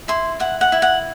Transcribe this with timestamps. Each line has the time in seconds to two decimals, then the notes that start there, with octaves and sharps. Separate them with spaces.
0.08 E4 C6
0.40 E4 F#5
0.61 F#5
0.72 E4
0.82 F#5